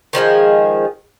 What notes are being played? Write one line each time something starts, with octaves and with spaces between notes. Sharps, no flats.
D#3 F3 G#3 G#4